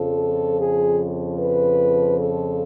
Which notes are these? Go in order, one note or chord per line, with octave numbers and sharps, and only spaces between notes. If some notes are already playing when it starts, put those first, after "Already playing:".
Already playing: F2 C#3 F3 A4
G#4
B4
A4